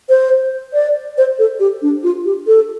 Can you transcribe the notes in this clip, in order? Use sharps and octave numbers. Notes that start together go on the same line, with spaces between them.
C5
D5
C5
A4
G4
D4
F4
G4
A4